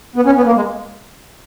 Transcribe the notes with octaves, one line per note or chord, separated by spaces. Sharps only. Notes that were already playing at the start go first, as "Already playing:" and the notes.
B3
C#4
B3
A#3
G#3